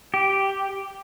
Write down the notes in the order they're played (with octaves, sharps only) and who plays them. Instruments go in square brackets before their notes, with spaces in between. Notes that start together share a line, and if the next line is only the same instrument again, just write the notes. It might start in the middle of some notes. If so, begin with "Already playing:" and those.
[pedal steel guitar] G4